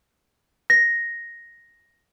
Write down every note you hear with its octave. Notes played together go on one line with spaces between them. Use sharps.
A#6